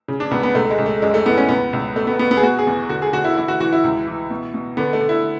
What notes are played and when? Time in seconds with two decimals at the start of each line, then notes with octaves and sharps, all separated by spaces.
0.08 C#3
0.20 D4
0.31 C#2 B3
0.43 B3
0.55 C#2 A3
0.70 G#3
0.78 C#2
0.86 A3
1.02 F#2 G#3
1.14 A3
1.25 E3 B3
1.37 C#4
1.49 C#2 B3
1.73 C#2
1.96 B2 A3
2.07 B3
2.19 B2 B3
2.31 B3
2.37 G#4
2.43 B2 F#4
2.59 G#4
2.67 E2
2.89 D3 F#4
3.02 G#4
3.13 D3 F#4
3.24 E4
3.37 E3 E4
3.48 F#4
3.60 E3 F#4
3.72 E4
3.84 C#2
4.07 E3
4.30 B2
4.54 B2
4.77 D3 B3
4.93 A3
5.01 D3
5.09 E4